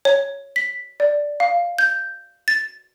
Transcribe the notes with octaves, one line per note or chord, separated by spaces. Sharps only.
C#5
B6
D5
F5
G6
A6